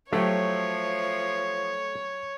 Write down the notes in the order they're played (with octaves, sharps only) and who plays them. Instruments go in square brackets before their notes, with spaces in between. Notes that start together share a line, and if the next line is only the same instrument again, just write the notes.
[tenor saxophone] F3 [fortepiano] F#3 G4 [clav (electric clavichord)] A3 [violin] C#5